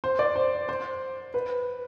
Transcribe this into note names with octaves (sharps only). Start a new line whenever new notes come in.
C5
D5
C5
C5
B4